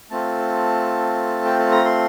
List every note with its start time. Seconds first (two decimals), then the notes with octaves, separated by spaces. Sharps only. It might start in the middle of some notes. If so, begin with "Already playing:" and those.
0.10 A3 C4 F4 A4 A5
1.45 G5
1.59 A5
1.72 A#5
1.85 C6